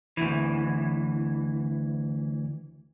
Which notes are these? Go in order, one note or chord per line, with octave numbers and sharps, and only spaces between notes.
D2 E3